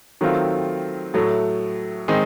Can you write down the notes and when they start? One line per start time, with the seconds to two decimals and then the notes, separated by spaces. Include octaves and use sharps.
0.21 D#3 F#3 A3 C4 F4
1.14 A2 F#3 A3
2.08 D#3 G#3 C4 D#4